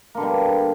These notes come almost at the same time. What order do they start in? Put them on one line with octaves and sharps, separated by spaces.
A#3 D3 B2 G3